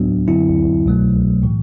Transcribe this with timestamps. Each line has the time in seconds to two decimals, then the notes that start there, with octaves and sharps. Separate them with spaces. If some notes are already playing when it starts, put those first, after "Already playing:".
Already playing: A2 F#3 B3 D4 F#4
0.27 F#2 D3 F#3 C4 E4
0.86 C2 B2 F#3 A3
1.43 A2 E3